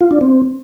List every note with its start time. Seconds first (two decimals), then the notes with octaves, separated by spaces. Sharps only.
0.01 F4
0.11 D4
0.21 C4